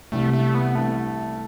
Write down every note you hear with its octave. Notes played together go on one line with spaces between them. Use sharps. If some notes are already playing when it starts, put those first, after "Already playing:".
C2 C3 E3 G3 A3
A3
B3
C3 E3 G3 A3